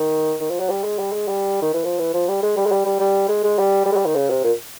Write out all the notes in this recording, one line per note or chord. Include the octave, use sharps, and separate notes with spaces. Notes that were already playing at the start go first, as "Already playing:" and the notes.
Already playing: D#3
D#3
F3
F#3
G3
G#3
G3
G#3
G3
D#3
E3
F3
E3
F3
G3
G#3
G3
G#3
G3
G3
G3
G#3
G#3
G3
G3
G#3
G3
D#3
C#3
C3
A#2